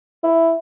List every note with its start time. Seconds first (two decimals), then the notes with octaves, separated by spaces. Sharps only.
0.24 E4